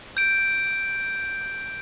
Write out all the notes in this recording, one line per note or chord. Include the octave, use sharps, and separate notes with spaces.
G6 D7